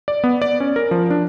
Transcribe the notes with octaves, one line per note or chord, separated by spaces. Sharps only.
D5
B3
D5
C#4
A#4
F3
D4